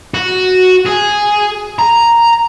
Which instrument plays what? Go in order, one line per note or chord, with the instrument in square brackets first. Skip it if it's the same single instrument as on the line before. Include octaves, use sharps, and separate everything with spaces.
[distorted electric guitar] F#4
G#4
A#5